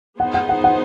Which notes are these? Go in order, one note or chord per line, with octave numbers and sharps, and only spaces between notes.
B3 D#4 G#4 C5 F#5
F#5
F#5
F#5